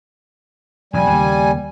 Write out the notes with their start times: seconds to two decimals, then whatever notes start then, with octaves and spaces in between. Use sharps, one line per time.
0.93 F1 A#1 F2 G3 G#5
1.11 D#2 C#3 A#3